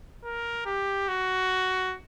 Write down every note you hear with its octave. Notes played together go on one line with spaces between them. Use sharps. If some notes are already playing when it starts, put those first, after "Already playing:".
A#4
G4
F#4